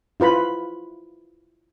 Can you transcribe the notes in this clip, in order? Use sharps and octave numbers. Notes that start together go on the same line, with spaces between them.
E4 F4 B4 B5